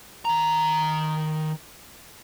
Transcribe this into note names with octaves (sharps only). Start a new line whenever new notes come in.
D#3 A#5